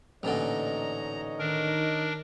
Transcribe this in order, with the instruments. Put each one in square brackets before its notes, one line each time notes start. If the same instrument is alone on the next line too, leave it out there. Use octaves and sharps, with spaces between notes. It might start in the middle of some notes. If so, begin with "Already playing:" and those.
[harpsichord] A1 A#2 D3 [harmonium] D#4 C#5 D#5 [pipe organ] A#5
[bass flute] D#3 [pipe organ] D4 A#4